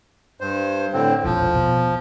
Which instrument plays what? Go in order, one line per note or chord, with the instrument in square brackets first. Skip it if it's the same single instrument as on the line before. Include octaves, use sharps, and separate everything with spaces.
[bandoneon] G2 C5
A2 D3 C4
[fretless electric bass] E1 A#1 [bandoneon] F3
[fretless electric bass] B2